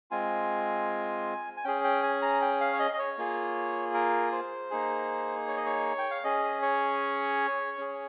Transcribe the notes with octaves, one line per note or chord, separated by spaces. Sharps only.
G#3 C4 F4 G#5
G#5
C#4 G#4 G5
G5
G#5
A#5
G5
F5
C#5
D#5
D#5
C#5
A#3 F4 G#4
A#4
C5
A#3 D#4 G#4
C#5
D#5
C#5
G5
F5
C#4 G#4 D#5
C#5
C#4 G#4